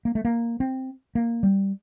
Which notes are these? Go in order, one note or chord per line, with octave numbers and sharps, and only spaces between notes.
A#3
A3
A#3
C4
A#3
G3